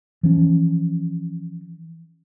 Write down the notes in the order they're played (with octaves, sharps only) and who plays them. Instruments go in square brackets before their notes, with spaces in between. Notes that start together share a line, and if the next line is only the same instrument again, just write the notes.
[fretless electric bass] E3 F3 C#4